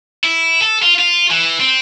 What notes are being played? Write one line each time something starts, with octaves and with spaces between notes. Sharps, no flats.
E4
A4
F4
F4
E3
C4